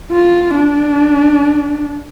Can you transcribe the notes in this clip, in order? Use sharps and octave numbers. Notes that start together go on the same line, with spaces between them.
F4
D4